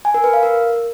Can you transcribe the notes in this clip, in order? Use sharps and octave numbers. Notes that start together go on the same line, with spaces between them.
G#5
A#4
B4
F5
A#4